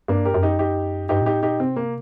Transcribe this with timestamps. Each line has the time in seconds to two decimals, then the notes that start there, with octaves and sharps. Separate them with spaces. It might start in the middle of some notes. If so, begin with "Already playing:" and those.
0.08 G2 A#3 D4
0.25 G4 A#4
0.34 F#2
0.42 D#4 G4
0.59 D#4 G4
1.09 G2 D#4 G4
1.22 A#2
1.26 A2 D#4 G4
1.43 A#2 D#4 G4
1.60 C3 C4
1.76 A#3